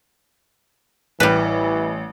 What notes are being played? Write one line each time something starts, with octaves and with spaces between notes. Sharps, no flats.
A1 E3 G3 B4